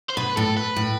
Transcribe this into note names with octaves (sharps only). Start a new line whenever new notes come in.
C5
B2 B4
A2 A4
B4
A2